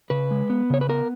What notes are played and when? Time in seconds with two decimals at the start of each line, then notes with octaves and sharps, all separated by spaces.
0.10 C#3 B4
0.31 G#3
0.50 B3
0.70 C#3 C#5
0.81 B4
0.89 B3 A#4